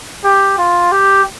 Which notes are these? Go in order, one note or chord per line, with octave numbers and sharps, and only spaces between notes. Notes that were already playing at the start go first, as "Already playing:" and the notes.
G4
F4
G4